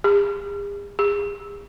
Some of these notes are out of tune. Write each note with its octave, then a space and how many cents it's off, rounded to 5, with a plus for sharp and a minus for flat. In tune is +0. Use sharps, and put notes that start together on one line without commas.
G#4 -45
G#4 -35